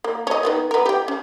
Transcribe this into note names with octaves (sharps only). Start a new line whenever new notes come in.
A#3
C#4 D#5
D#3 A#3 B3
B3 A#4
G4 G5
C#4